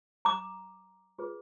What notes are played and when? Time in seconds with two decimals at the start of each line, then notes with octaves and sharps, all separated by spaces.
0.25 A#5 D6
1.19 F4 G#4 B4